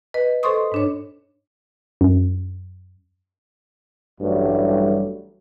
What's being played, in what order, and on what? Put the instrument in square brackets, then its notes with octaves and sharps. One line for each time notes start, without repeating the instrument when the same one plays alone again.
[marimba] B4 D#5
A4 C5 D#5 C6 C#6 D#6
G#2 D4 C#5
[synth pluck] F#2
[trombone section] A1 G2 F#3 G3 A3